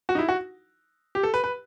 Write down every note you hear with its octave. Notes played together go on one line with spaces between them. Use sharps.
F#4
D#4
E4
F#4
G4
A4
B4
B4